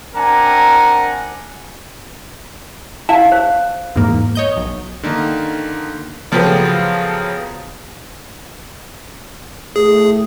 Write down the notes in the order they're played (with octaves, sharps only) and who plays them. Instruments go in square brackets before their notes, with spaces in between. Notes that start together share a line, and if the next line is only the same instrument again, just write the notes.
[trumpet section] C4 D4 A#4 F#5 G#5 A#5
[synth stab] E4 E5 [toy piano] F5 A5
[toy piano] C5
[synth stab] E2 G#2 A#3
C#5 D#5 G6
B1
[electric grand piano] D3 D#3 A#3
[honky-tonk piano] C#3 F3 F#3 B3 G4 A4
[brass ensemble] A2 A3 [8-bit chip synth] G#4